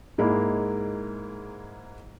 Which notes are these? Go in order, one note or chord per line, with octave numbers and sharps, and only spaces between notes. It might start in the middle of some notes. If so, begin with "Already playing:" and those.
G#2 G#3 A#3 E4